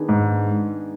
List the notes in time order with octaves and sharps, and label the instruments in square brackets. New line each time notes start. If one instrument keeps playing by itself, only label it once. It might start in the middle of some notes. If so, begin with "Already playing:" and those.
Already playing: [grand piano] D#3 B3 D4 G#4
[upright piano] G#2